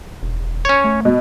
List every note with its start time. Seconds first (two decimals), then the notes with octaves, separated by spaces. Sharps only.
0.22 E1
0.65 C#4 C#5
0.84 A3
1.05 B2